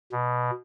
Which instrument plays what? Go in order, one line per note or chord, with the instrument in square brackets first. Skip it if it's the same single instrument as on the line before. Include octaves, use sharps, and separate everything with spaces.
[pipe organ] B2